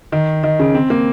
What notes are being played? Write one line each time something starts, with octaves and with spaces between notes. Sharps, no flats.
D#3
D#3
C#3
C4
A#3